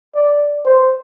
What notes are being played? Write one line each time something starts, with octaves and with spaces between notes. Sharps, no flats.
D5
C5